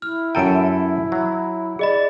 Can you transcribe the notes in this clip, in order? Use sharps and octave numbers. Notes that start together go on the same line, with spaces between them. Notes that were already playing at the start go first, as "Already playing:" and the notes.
E4 F6
F#2 A4 G5 A#5 D7
F#3
G#4 D5 D#5 B5